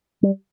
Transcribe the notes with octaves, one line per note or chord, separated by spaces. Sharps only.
G3